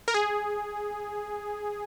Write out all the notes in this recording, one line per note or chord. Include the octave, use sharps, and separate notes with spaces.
A#4
G#4